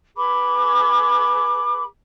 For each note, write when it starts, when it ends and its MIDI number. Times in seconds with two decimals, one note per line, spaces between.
0.16 1.84 68
0.16 1.84 71
0.16 1.84 83
0.16 1.84 86